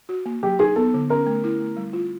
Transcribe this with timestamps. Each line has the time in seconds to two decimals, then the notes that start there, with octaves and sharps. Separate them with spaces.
0.09 F#4
0.26 A#3
0.43 F#3 G4
0.59 D#4 G#4
0.76 B3 A4
0.94 D3
1.10 C#4 A#4
1.27 A3
1.44 E4
1.60 A3
1.76 G3
1.93 F4